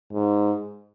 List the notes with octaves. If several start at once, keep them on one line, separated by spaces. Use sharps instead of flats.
G#2